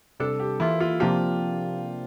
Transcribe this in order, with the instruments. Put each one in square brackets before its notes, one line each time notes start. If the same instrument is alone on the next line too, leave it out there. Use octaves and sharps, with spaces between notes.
[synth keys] C3 G3 D4 [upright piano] A4
[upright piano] G4
[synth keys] E3 A#3 F4 [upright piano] E4
[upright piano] F4
[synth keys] C3 F3 A#3 D4 G4 [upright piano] F4